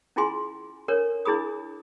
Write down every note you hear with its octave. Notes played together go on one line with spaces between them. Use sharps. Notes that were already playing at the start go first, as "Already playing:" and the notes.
C#4 E4 F4 G#4 G#5 C6
D4 A4 A#4 C#5
D4 E4 G#4 B5 D#6